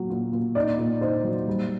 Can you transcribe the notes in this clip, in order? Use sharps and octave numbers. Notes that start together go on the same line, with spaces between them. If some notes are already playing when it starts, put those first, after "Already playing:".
Already playing: A#2 F#3
A#2
A#2
D#4 D5
A#2
D#4 C5
F#3
G3